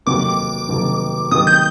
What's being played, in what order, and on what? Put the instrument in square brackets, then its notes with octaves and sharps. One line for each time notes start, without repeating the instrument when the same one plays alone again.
[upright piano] F1 D#2 D#3 F#3 [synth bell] D6
[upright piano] F1 D#2 D#3 F#3
[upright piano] F1 D#2 D#3 F#3 [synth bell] D#6
[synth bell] G6